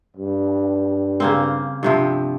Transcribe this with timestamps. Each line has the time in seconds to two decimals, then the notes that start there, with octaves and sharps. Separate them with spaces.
0.16 G2
1.20 C#3 A#3 C4
1.83 G2 C3 F3